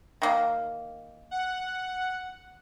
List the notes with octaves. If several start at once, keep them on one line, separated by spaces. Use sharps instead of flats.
D#3 A#3
F#5